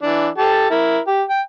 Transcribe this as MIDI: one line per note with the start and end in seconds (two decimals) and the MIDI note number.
0.02 0.28 52
0.02 0.28 62
0.38 0.69 67
0.38 0.69 69
0.38 0.69 81
0.70 0.98 64
0.70 0.98 70
1.07 1.22 67
1.30 1.41 79